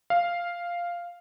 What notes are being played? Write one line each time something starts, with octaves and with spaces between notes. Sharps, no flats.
F5